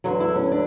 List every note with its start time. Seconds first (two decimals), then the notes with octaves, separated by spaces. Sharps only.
0.04 E2 D3 F#3
0.20 E4
0.36 C#4
0.51 D4